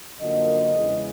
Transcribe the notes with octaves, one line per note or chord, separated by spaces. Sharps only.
F#2 D3 F3 A#3 D4 D#5
E2 C#3 E3 G#3